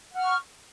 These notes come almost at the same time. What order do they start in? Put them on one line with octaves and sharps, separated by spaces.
F#5 F6 C#6